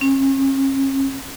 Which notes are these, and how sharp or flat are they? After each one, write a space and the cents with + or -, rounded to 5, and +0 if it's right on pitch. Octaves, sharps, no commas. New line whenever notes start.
C#4 -40